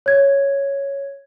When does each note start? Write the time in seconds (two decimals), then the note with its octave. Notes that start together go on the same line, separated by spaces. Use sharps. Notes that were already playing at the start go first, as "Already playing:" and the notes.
0.06 C#5 G#6